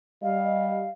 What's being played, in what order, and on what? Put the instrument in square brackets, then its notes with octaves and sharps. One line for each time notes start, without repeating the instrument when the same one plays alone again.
[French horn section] G3 D#5 [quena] F5